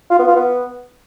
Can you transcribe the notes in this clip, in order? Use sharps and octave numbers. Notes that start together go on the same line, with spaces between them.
F4
B3
F4
B3